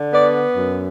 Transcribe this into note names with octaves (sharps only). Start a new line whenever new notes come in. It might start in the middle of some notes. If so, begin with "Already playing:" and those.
Already playing: D3
B3 D5
F#2